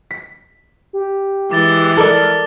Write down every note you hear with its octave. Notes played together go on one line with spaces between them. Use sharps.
B6
G4
E3 G#3 D6 A6 G7
A4 A#4 D5 F6